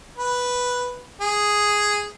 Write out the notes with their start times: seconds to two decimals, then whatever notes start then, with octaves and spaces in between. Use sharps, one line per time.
0.17 B4
1.21 G#4